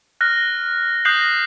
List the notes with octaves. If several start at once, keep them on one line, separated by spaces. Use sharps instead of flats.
F6 F#6 A#6
D#6 F#6 G6 A#6 C7 F#7